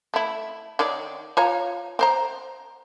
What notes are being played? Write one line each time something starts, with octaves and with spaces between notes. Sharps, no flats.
A3 E4
D#3 C#5 D5
F4 C#5 A#5
C4 C5 A#5